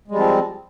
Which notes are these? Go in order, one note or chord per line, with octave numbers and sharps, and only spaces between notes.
F3 G3 G#3 C4